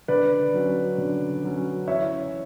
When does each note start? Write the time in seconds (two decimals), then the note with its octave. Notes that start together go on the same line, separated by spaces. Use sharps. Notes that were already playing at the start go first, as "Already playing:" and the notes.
0.08 D3 B4 D5
0.54 F#3 C#4
0.98 D3
1.43 F#3 C#4
1.88 E3 C#5 E5